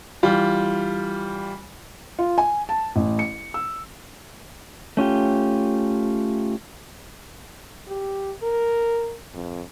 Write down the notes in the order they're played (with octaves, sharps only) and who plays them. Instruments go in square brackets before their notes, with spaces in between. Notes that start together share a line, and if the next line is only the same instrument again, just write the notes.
[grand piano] E3 G3 F4
[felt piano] F4
G#5
A5
A1
C#7
E6
[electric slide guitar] A3 C#4 F4 G4
[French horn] G4
A#4
F2